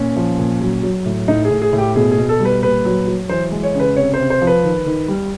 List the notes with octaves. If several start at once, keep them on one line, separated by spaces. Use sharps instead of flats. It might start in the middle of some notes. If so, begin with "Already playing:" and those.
Already playing: A#2 C#4
F3
A#2
F#3
F#3
A2
A2 D#4
G#4
A2
G#4
A2
G4
B2 G#4
G#4
B2
A4
G3
B4
A#2 B4
F#3
F#3
E3 C5
G#3
C#5
C#3 B4
C3 C#5
C5
C3
C5
F3
B4
D#3
D#3
G3